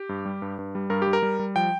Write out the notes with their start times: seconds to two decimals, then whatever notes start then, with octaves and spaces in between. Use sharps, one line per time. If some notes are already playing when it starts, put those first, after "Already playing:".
Already playing: G4
0.09 G2
0.25 G3
0.42 G2
0.59 G2
0.75 G3
0.90 G2 A#4
1.02 G4
1.07 G3
1.13 A#4
1.23 G3
1.39 G3
1.56 F3 G5